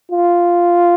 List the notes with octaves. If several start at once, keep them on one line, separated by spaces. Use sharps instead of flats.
F4